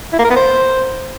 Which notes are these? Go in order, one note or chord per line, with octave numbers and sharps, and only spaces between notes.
E4
A#3
A#4
B3
C5